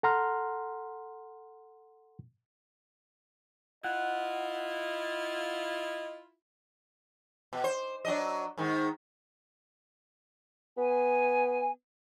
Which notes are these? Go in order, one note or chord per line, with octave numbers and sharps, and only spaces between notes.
A4 F#5 A#5 C6 F6
E4 F4 D#5 F#5
B2
C5
F#3 D4 D#5
G#2 D#3
B3 G#5